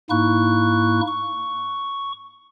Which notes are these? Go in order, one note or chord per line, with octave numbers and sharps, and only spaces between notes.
G#2 A#3 D#4 E4 C#6 F#6
C#6